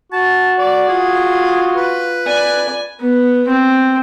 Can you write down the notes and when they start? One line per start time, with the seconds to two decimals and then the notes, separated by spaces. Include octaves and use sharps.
0.12 F#4 A5
0.58 D5
0.88 F4 G#4
1.76 B4
2.26 D5 G#5
3.01 B3
3.48 C4